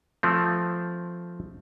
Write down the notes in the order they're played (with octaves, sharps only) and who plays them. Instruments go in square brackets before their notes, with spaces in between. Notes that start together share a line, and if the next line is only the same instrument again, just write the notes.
[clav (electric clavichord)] F3 A3 C4